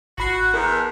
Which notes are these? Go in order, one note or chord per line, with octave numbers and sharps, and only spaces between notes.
G#1 F#4 B5 C7
F#6
E2 A#4 A#5
A5